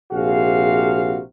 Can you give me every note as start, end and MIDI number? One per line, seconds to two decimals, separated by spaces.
0.12 1.19 34
0.12 1.19 48
0.12 1.19 66
0.12 1.19 68
0.12 1.19 77